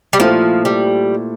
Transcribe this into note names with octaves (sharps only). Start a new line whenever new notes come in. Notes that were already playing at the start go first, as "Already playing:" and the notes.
G3
A#2 F3 A3 E4 A4 C5
G3